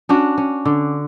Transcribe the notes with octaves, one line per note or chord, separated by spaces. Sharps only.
C#4 D4 F#4
C#4
D3